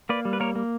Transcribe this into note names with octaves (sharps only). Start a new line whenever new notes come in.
A#3 B4 D5
G3
B4
A#3 A#4 C#5
A#3